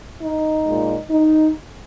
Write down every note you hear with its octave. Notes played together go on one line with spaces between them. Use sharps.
D#4
A#2 G#3
D#4